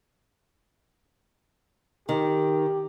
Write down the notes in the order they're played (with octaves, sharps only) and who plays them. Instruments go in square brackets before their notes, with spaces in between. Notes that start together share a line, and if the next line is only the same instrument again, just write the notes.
[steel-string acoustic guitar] D#3 [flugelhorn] G4